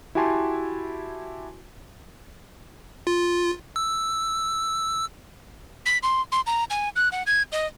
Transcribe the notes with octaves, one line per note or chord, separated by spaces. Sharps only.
E4 F#4 G4 G#5 A5 C6
F4
E6
B6
C6
C6
A#5
G#5
F#6
F#5
G#6
D#5